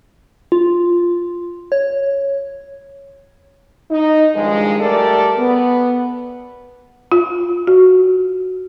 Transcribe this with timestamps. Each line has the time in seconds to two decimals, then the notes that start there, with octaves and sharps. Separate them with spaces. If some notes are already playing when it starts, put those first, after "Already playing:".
0.52 F4
1.72 C#5
3.91 D#4
4.35 G2 D#3 F3 G#3
4.80 G3 A3 G4 A4 A#4 D5
5.39 B3
7.12 F4
7.67 F#4